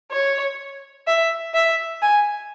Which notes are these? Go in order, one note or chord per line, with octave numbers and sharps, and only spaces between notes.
C#5
E5
E5
G#5